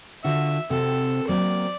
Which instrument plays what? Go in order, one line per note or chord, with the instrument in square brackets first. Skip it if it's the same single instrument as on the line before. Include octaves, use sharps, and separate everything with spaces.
[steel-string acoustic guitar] D3 F4 F#4 [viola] E5
[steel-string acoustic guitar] C3 F#4 [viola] C4 A4
[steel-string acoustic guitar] F#3 A#3 C4 [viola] D5